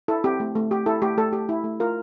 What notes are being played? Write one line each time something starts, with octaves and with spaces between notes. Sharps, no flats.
E4 A4
C4 G4
A3
A3
G4
E4 A4
A3 G4
A3 A4
G4
E4
A3
F4 A#4